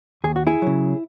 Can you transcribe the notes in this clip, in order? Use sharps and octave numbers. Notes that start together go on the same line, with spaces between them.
D#2 G#4
F#4
E4 G#4
C#3 F#3